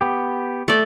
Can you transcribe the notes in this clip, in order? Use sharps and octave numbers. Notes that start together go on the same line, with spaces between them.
B3 G4
A3 D5